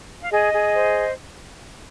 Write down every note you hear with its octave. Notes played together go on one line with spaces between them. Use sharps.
F5
G#4 D#5
G#4
C5